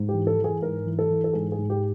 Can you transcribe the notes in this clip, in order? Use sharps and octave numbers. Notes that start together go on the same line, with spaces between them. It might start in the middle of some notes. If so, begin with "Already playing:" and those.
Already playing: G#2
G4
E3
A4
E3
G#4
G#2 A#4
E3
A4
E3
A4
G#2 G#4
G#4
G#2
G4